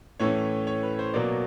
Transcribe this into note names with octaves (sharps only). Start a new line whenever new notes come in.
A2 E3 A3 C#4 C#5
C#5
B4
C5
B2 F#3 A#3 D5